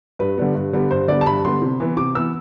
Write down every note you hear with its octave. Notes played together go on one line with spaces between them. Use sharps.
G2 B4
D3 G3 B3
G2
D3 G3 B3
G2 C5
D3 G3 B3 D5
A5
G2 B5
D3 G3 B3 C6
C3
E3 B3
C3 D6
E3 B3 E6